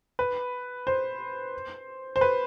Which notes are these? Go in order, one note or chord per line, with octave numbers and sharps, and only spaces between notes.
B4
C5
C5
B4